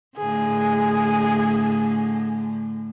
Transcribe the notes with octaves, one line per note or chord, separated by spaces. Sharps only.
A2 D3 G#4